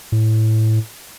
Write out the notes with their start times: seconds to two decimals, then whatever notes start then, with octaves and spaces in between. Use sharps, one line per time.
0.12 A2